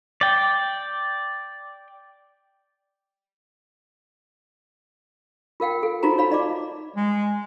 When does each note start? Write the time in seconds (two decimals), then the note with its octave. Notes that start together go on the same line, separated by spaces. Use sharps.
0.21 D5 G5
5.60 F4 A#4 F5 G5
5.83 A4
6.03 D#4 F4 F#4 C5 A#5
6.18 C#5 F5 B5
6.31 D#4 D5 D#5 D6
6.96 G#3